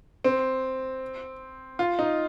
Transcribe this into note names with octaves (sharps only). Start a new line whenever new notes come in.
C4
F4
D#4